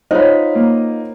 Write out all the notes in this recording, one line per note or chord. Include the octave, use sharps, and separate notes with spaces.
D#4 F4 C5 C#5 D#5 F#5 B5
A#3